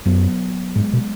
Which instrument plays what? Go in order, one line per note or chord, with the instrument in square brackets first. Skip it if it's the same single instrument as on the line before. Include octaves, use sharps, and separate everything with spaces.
[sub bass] F#2 [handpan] F#3 B3
[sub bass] G#2 [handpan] G#3
[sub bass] B2